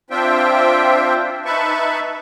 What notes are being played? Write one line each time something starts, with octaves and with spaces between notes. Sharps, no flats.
C4 D4 F4 C5 E5 G5
D#4 B4 E5 A5 B5 C#6